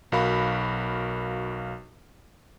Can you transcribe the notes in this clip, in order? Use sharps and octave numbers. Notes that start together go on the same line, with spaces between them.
B1 F#4 A#4 F5 B5